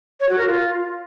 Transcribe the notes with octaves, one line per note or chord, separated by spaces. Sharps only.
C#5
F#4
A#4
F4